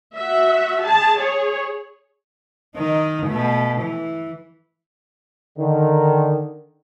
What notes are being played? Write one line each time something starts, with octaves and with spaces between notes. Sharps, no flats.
F#4 E5
G#4 A5
G#4 C#5
D#3 D#4
B2 A3
E3
D3 D#3